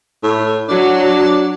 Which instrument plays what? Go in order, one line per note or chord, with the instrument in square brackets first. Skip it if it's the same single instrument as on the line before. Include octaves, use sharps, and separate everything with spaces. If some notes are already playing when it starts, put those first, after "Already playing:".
[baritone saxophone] A2
[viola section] F#3 [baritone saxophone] D4